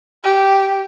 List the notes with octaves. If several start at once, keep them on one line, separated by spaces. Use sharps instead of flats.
G4